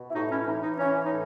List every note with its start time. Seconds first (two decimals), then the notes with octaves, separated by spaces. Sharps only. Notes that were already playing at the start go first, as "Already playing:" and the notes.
Already playing: B2
0.10 E4
0.14 A2 D#4 F#4
0.31 C#4 E4
0.46 E3 D#4
0.62 D#4
0.78 E3 C#4
1.05 D#4
1.10 A2